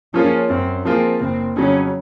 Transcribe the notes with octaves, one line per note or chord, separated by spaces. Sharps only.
F3 A#3 C#4 F4 G#4
F#2 C4
F3 A#3 C4 F4 G#4
F#1 C4
F2 C#3 F#3 C#4